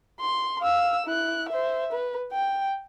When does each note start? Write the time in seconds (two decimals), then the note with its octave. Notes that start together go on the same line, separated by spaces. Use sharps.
0.20 C6
0.61 F5 E6
1.06 E4 F#6
1.49 C5 E5
1.92 B4
2.32 G5